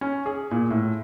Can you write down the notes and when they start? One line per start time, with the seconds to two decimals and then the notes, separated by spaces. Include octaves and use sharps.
0.01 C#4
0.26 G#4
0.51 A#2
0.71 A2